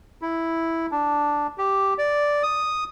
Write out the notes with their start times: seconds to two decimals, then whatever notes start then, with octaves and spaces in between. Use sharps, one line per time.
0.22 E4
0.92 D4
1.58 G4
1.98 D5
2.43 D#6